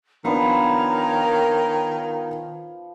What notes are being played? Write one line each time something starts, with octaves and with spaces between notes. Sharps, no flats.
D#3 F3 B3 D4 A#4 B4 C#5 A#5